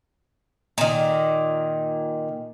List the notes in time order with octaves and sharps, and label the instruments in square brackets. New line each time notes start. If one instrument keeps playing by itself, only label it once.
[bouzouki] A#2 D#3